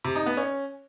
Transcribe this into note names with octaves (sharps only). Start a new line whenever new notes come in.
C3
D#4
B3
C#4